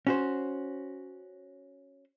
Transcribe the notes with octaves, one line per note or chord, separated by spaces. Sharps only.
C#4 F#4 C5